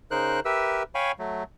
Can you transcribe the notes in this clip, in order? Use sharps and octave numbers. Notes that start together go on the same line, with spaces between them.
C#3 D#4 A#4 C5 F#6
G4 A#4 B4 E5 E6
C#5 F5 G5 G#5 B5 C#6
F#3 A3